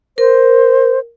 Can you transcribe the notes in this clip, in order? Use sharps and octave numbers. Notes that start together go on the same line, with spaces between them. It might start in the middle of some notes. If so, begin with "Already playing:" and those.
A#4 C5